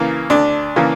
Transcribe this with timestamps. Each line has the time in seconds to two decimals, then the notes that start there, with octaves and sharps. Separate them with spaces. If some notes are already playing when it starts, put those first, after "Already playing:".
Already playing: C#3 E3 A#3
0.30 D2 D4
0.76 C#3 E3 A#3